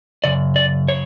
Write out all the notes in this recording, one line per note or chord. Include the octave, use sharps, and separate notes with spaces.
F#2 C#3 D5
D5
C#5